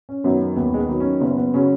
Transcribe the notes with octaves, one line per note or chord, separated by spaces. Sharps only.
C#4
F#2 D#3 F#3 B3
B3
D#2 B3
G#3
B3
D#3 F#3
C#4
F#1 B3
B3
C#3 F#3 C#4